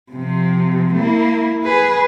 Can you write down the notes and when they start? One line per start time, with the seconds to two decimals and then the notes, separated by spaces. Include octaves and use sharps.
0.12 C3 F3
0.94 A#3 E4
1.64 G#4 B4